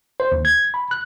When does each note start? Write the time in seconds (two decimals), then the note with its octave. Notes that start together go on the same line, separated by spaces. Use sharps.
0.20 C5
0.32 D#2
0.45 G#6
0.74 B5
0.91 F#6